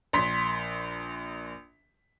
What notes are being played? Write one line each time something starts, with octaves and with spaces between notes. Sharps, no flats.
A#1 C6 B6